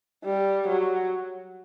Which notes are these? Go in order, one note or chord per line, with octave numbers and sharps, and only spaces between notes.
G3
F#3